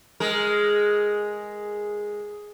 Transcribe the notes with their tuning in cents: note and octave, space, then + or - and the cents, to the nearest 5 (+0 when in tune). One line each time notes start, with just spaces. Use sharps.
G#3 +0 A#4 +0